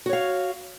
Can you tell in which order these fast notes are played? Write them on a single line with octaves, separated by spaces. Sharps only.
F#4 C#5 F5